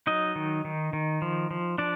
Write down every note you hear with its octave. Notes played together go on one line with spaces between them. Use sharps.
F#3 D#4 D#5
D#3
D#3
D#3
F3
F3
F3 D4 D5